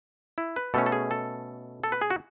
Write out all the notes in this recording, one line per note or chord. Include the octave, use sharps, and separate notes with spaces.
E4
B4
B2 A3 C#4 A4
A4
G#4
A4
A4
B4
G#4
F#4